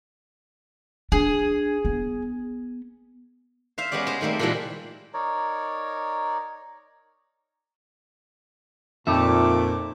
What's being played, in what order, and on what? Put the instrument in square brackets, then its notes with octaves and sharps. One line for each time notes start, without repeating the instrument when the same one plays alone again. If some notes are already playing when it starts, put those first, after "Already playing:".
[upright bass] D4 [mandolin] G#4
[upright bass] B3
[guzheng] C5 E5 F5
G#3 B3 C#4 G4 D5
G#3 C5
D#3 G3 A3 A#3 C4
A#2 C#3 E3 F3 G3 G#3
[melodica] D#4 A#4 C#5 D5
[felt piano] F2 [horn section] A#2 [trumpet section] A3 D6 [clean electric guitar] D#4 A4 E5